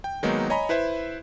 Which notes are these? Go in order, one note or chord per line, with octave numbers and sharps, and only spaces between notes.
G5
D#3 F#3 G#3 A#3 B3 D#4
C#5 D#5 G#5 A#5 B5
E4 B4 C5 E5